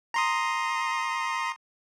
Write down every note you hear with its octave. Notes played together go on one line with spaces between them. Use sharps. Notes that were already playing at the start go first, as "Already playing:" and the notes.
A#5 C6 D#6